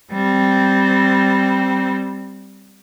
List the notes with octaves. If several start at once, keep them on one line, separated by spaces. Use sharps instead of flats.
G3 C4